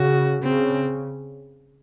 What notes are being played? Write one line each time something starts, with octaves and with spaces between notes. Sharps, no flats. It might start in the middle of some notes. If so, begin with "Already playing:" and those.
Already playing: C#3 F#4
C#3 C4